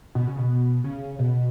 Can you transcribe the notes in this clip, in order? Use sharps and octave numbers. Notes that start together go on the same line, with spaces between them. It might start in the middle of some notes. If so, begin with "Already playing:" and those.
B2
C#3
B2
C#3
B2